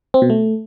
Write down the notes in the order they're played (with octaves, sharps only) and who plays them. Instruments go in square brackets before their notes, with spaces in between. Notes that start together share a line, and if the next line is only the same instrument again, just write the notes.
[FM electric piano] C4
B2
A3